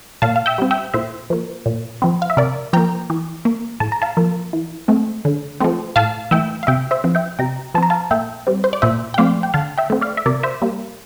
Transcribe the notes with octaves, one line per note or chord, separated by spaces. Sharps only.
A#2 F5 A5
F5
E5 G5
G3 C4
E5 G5
A#2 C5 E5
F3 A#3
A#2
F3 C4
F5
E5
C3 A#4 D5
F3 A#3 G5 A#5
E3
A#3
A2 A5
A#5
F5 A5
F3 A#3
E3
A3 C4
D3
F3 A3 C4
A2 F5 A5
E3 A3 E5 G5
F5
C3 E5 G5
C5 E5
F3 C4
E5 G5
C3 G5 A#5
F3 C4 A5 A#5
F5 A5
A#2 E5 G5
G3 C4
C5
D5
A#2 C5 E5
G5
F3 A3 C4 D5 F5
G5
D3 F5 A5
E5 G5
A3 C4
D5 F5
E5
C3 A#4 D5
C5 E5
G3 A#3